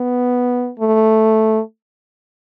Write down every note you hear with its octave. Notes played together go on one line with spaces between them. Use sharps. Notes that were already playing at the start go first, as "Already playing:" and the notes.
Already playing: B3
A3